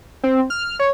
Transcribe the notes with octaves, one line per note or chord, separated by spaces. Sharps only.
C4
F6
C#5